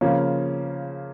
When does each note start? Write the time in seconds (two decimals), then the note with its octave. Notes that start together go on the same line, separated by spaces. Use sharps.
0.01 C#3 F3 A#3 C#4